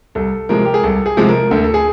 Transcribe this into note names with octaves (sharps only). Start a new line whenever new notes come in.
C2 A4
C3 F3 G#3 A#4
G4
G#4
C2 A4
G#4
C3 F3 G#3
A#4
D2 A4
A4
G#4